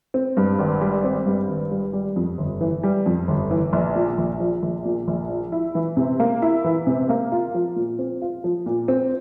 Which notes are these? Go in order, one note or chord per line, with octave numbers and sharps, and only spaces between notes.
C4
G2
G#1
G3
C4
G2
G#1
G3
G3
F2
G1
E3
G3
F2
G1
E3
A#1
A#2
A#1
F3
A#1
A#2
A#1
F3
E4
E3
C3
A#3
E4
E3
C3
A#3
F4
F3
A#2
C4
F4
F3
A#2
C4